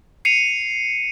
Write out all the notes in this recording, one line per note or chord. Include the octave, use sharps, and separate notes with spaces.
C7 C#7 D#7 F7